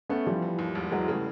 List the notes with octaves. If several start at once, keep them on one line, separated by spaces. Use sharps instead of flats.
A3 B3 C#4
E3 F3 G3
E3
D#2
E1
E3 F#3 G#3
C#3 G3 A3